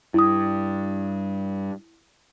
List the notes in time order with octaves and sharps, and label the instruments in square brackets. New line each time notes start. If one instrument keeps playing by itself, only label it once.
[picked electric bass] G2 [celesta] E4 D#6